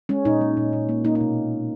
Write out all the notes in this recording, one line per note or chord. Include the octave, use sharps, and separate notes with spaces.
G#3 C#4
A#2 D#4
G#3
A#2
A#2
A#3
A#3 D#4
D#4
B2